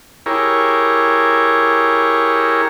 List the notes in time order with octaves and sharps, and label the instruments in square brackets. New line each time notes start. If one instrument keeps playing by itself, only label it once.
[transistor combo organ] E4 G4 G#4 A#4 C#5